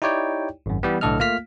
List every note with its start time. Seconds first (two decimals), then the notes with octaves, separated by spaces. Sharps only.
0.02 D#4 E4 G4 C#5 D5 G5
0.66 G#1 F#2
0.83 E3 G3 B3
1.01 B1 A2 D3 A4 D#5 F6
1.19 A3 A#3 F4 F5 F6 B6